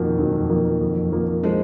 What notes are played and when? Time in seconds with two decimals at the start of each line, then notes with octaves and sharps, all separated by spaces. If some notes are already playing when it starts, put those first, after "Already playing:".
Already playing: F2 B2 D#3 F3 A#3
0.18 F2 D#3 F#3
0.50 F3 A#3
0.81 F2
1.12 F3 A#3
1.43 F3 G#3